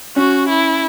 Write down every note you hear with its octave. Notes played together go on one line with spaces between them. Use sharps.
C#4 F#4
E4